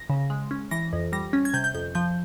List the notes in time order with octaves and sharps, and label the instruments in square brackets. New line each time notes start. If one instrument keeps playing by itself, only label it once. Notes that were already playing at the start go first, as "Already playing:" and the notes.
Already playing: [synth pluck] A#6
C#3
G#3
C#4
E3 A#6
F2
G3 A#6
C#4
G#6
C3 G6
G6
F2 G6
F3 G6